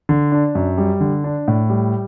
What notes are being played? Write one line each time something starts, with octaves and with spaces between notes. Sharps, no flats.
D3
D4
F#2
G3
D3
D4
A2
G3